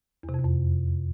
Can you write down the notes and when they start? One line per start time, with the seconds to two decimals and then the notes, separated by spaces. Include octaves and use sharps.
0.23 E2
0.29 C3
0.34 F2
0.40 E2
0.45 F2